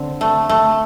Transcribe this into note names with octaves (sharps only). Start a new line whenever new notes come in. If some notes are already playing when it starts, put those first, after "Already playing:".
Already playing: D3 C4
A3
A3